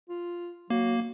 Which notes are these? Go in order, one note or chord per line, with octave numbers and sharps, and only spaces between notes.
F4
F#3 A#3